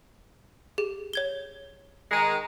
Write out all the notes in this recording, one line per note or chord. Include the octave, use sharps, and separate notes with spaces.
G4 G#4
C#5 G#6 G7
D#3 G#3 A#5